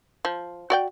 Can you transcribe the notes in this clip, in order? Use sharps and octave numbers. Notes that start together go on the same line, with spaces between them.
F3
F#4 D5 G5